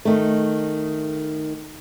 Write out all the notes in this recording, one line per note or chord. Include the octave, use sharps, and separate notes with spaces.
D#3 A3